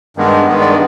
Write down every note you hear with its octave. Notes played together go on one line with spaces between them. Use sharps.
G2 D#3 G#3 B3
G2 D#3 G#3 B3
D5